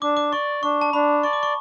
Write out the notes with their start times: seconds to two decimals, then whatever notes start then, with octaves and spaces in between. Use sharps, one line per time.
0.02 D4 D6
0.17 D6
0.32 D5 C#6
0.63 D4 C#6
0.81 A5
0.93 D4 B5
1.23 D5 C#6
1.33 D6
1.43 C#6